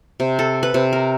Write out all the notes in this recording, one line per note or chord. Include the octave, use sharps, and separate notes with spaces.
C3
A4
B4
C3
A#4